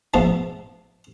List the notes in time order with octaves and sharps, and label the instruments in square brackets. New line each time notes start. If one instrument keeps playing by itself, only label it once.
[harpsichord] G#2 B2 F3 A3